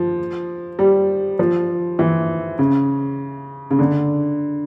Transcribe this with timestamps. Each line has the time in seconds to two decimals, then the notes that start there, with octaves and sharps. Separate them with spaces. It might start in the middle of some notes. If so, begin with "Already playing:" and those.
Already playing: F3
0.79 G3
1.39 F3
1.99 E3
2.59 C#3
3.71 C#3
3.79 D3